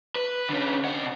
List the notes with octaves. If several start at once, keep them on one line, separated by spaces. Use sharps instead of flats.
B4
D3 C#4
C3 F#5